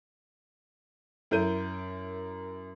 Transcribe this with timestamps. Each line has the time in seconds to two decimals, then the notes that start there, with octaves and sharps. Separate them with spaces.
1.31 F#2 E4 A#4 G6 D#7